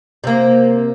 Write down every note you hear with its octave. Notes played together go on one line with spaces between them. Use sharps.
C3 A#3